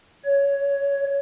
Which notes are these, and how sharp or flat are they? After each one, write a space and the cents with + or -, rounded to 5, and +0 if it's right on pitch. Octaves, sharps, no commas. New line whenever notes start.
C#5 +15